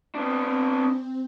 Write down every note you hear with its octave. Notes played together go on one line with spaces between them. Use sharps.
B3 C4 D4